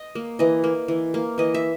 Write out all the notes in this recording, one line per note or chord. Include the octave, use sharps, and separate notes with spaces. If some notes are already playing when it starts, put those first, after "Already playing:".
Already playing: D#5
A#3
E3 D#5
A#3
E3
A#3
E3 D#5
E5